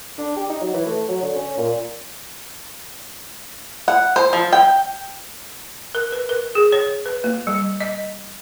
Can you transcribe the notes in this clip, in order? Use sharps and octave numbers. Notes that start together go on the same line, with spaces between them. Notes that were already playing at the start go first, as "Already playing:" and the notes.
D4
G4
D#4
F#3
E3
A3
F#3
D3
C#4
A#2
F#5
C5
F3
G5
A#4
B4
A#4
G#4
C#5
B4
A#3
G3
D#5